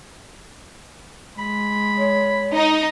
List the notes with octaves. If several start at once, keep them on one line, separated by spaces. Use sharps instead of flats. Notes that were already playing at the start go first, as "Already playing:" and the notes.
G#3 B5
C#5
D#4